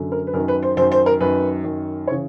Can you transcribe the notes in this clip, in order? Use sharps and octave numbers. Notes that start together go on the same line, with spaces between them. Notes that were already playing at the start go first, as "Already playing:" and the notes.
Already playing: F#2 D3
A#4
B4
F#2 D#3 A#4
B4
C5
F#2 D#3 C5
C5
A#4
F#2 D#3 B4
F#2 D#3
C#3 E3 C#5